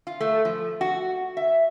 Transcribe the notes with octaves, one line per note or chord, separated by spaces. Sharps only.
F4
A3
F3
F#4
E5